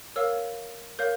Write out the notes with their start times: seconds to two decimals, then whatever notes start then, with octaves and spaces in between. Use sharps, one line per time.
0.16 A#4 C#5 F5 E6
0.99 A#4 C#5 F5 G6